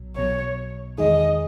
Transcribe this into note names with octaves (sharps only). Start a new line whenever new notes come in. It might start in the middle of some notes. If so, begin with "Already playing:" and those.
Already playing: B1 B2 F#3
B1 B2 F#3 C#5
E2 D#3 G#3 D#4 G#4 D#5